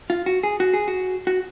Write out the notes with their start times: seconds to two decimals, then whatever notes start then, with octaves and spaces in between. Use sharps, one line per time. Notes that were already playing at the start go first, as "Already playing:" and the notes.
0.10 F4
0.26 F#4
0.43 G#4
0.60 F#4
0.74 G#4
0.88 F#4
1.27 F#4